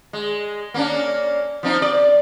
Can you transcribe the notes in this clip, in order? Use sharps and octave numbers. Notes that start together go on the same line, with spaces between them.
G#3
A#3 C#4 D4
F3 C4 D#4
D5